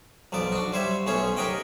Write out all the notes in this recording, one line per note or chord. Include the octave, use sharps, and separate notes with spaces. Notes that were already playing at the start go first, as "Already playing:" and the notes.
B1 F3 B3 D5
D4 F#4
G3 C5 C#5 E5
B1 A3 B3 C#4 C5 C#5
G4 A#4 C#5 D#5 F#5 G5